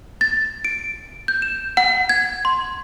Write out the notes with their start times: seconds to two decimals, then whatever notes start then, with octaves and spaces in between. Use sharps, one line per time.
0.21 A6
0.65 D7
1.28 G6
1.42 E7
1.77 F#5
2.09 G#6
2.45 C6